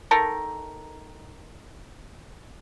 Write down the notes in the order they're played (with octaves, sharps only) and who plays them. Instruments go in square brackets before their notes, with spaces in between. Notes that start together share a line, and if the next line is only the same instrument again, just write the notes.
[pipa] D#3 A4 A#4